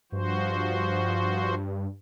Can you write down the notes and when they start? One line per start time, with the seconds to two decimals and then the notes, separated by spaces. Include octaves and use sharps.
0.12 G2 F3 F#4 C5